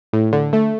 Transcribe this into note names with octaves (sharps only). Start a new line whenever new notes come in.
A2
D3
A3